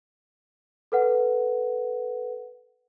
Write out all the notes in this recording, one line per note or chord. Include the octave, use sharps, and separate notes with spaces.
A4 B4 F#5